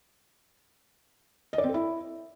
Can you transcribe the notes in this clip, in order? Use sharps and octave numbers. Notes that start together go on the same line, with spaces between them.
D#5
D5
C4
A4
E4